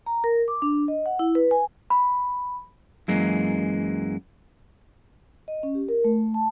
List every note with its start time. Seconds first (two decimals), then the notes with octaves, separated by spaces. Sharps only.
0.06 A#5
0.24 A#4
0.48 D6
0.62 D4
0.88 D#5
1.06 F#5
1.19 E4
1.35 B4
1.51 G#5
1.90 B5
3.08 F#2 E3 G#3 A#3
5.48 D#5
5.63 C#4
5.75 G4
5.89 A#4
6.04 A3
6.34 A5